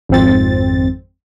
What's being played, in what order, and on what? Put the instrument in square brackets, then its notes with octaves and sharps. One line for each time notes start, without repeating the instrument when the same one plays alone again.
[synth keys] G#1 F2 C4 A6